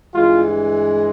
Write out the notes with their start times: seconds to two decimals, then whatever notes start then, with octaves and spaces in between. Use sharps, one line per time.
0.15 G2 E3 G#3 F4